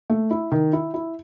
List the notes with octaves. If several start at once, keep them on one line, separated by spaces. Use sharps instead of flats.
A3
E4
D#3
E4
E4